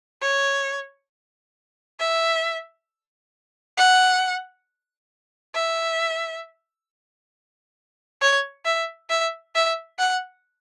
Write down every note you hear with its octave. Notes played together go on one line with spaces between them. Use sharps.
C#5
E5
F#5
E5
C#5
E5
E5
E5
F#5